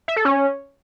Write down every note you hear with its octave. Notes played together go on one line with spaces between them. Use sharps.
E5
A4
C#4